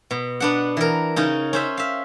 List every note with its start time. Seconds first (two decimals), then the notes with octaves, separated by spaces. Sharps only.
0.11 B2
0.40 B3 D4 F#5
0.77 E3 A#4
1.16 C#3 C#4 D#4
1.53 C#4 C5 E5
1.77 E5 F5